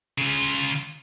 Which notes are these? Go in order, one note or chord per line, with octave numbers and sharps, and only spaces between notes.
C#3 F4